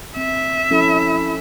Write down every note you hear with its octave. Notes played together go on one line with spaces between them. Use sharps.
C4 E5
F3 C#4 E4 A4